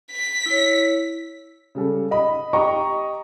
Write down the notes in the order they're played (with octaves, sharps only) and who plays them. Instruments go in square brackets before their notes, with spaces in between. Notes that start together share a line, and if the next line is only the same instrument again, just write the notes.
[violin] B6
[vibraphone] E4 C#5
[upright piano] C#3 G3 A4
D#5 B5
G4 D#5 G5 A#5 C#6